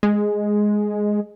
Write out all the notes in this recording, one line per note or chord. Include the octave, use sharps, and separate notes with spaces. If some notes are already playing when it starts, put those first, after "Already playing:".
G#3